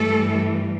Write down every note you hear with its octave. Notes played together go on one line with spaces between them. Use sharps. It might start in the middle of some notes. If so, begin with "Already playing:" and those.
Already playing: G2 E3 G3 A3 A4